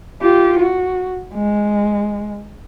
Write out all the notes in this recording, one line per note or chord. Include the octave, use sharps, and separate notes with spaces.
F4 G4
F#4
G#3